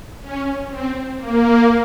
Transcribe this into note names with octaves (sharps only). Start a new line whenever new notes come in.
C#4
C4
A#3